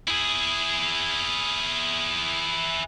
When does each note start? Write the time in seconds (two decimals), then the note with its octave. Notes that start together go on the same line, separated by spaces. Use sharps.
0.08 E4 G#4